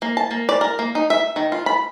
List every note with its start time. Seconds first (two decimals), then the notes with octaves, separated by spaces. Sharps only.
0.02 A#3
0.17 A5
0.31 A#3
0.49 D5
0.61 A#4
0.79 A#3
0.95 D#4
1.10 E5
1.36 D#3
1.52 F4
1.66 B5